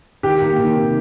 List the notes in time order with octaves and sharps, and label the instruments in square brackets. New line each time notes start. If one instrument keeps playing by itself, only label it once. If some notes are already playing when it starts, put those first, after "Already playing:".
[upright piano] D#3 [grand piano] G4
[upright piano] A#3
D#3
C3